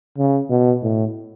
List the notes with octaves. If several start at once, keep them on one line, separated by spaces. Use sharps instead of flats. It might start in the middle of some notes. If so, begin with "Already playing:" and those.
C#3
B2
A2